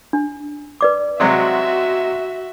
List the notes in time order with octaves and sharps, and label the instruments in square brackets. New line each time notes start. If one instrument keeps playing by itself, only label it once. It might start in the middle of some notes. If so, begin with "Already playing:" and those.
[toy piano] D4
B4 D5 D6
[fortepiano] C3 F#3 G#3 [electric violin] F#4 E5